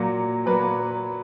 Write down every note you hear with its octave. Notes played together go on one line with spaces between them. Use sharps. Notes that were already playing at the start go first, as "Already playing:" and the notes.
Already playing: A#2 F#3 A#3
A#2 F#3 A#3 B4